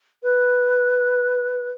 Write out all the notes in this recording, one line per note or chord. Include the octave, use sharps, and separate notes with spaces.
B4